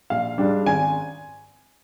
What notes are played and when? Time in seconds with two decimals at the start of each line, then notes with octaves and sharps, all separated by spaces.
0.10 A#1 F5
0.38 G#2 G3 D4
0.66 G#1 G#5